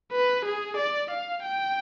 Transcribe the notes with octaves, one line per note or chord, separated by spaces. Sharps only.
B4
G#4
D5
F5
G5